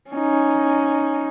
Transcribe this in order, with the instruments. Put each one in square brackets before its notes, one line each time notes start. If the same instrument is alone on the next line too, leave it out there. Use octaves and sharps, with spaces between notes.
[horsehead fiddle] C#4 D#4